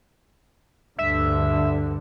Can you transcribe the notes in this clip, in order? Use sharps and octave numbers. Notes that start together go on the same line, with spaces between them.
D2 G2 D3 E5